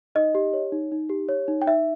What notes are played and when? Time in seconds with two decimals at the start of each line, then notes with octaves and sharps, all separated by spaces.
0.15 D#4 D#5
0.35 G4
0.53 C#5
0.72 D#4
0.92 D#4
1.09 G4
1.29 C#5
1.48 D#4
1.62 G5
1.67 D#4 E5